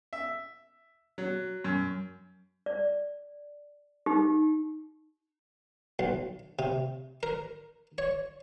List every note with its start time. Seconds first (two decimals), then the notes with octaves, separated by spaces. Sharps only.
0.13 E5
1.18 F#3
1.64 F#2
2.66 D5
4.06 D#4 G4
5.99 B1
6.59 C3
7.23 A#4
7.98 C#5